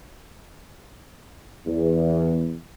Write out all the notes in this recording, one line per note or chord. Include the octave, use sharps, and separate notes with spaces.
E2